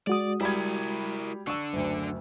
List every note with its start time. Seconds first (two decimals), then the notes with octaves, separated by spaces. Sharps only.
0.07 G#3 F#4 D5 D#6
0.41 G3 E4 A#4 B5 G#6
1.47 D3 D4 C#6 E6
1.73 F#1 D2